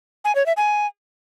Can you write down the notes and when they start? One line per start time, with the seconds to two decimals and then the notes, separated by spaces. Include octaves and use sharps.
0.25 G#5
0.35 C#5
0.46 E5
0.57 G#5